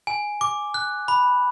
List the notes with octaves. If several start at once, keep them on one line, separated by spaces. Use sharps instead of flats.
G#5
D6
F#6
B5